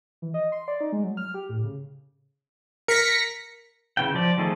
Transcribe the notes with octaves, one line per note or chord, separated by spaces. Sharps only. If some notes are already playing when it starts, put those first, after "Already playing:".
E3
D#5
C6
D5
D#4
G#3
F#3
F6
G4
A2
C#3
A#4 A#6 B6 C#7
C#3 E3 G5
F3 D5
D#3 F3 A3 G#4